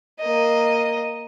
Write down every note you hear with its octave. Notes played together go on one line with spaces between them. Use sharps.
A#3 D#5